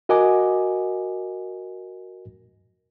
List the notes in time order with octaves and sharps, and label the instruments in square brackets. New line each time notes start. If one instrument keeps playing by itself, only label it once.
[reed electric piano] F#4 A#4 D#5 F#5 G#5 D6